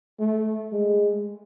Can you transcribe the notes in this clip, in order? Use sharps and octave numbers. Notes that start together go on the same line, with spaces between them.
A3
G#3